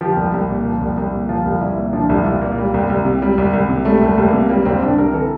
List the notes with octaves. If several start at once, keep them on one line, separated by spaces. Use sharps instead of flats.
F3 G4
C2
C2
A#2
F3
C2
C2
A#2
F3 F4
C2
C2 E4
A#2
F3 D4
C2 E4
C2 F4
A#2 A#3
G3
C2
C2
C3
G3
C2
C2
C3
G3 A3
C2
A3
C2
C3 A#3
G3 A#3
C2 C4
C2 D4
C3 A#4
E3 A4